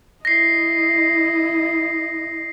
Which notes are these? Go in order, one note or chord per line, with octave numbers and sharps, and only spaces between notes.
E4 D#5 A#6 C7